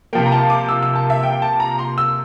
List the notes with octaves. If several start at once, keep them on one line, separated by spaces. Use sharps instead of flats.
C3 F3 A#3 G5
A#5
A5
D6
E6
E6
A5
E5
G5
A5
A#5
C6
E6